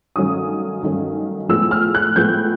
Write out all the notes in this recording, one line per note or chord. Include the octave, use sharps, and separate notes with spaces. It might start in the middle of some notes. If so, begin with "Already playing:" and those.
G2 D#3 F#3 A3 C#4 D#6
G2 D#3 F#3 A3 C#4
A2 F3 G#3 B3 E6
F6
F#6
A2 F3 G#3 B3 G6